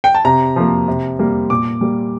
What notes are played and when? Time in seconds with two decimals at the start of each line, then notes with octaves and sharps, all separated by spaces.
0.04 G5
0.15 A5
0.25 C3 A#5
0.56 F3 A#3
0.88 C3
1.19 G3 A#3
1.50 A#2 D6
1.81 G3 A#3